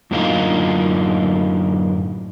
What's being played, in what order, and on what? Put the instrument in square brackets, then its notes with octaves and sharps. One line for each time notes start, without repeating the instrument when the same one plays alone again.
[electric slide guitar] F#2 A2 D3 A#3 D#4 F4